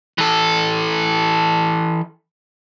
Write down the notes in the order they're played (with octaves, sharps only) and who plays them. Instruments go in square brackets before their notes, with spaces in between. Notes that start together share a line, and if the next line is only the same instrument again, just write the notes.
[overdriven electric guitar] E3 A4